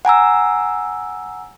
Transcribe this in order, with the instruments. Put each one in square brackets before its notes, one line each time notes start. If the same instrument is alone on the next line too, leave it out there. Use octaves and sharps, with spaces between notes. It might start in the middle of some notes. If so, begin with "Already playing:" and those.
[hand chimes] F#5 G#5 A#5 E6